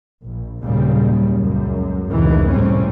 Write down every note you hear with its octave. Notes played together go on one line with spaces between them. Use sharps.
A#1
F#1 D#2 A#2 C#3 G3
C#2 F#2
F1 C#2 F#2 A#2 D#3 E3
E2 A2 C3 G3 C4 C#4